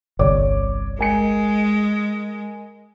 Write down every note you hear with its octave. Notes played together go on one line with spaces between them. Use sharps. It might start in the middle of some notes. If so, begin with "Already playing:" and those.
G1 C2 C#5 D5 D6
G#3 A#4 G#5 C#7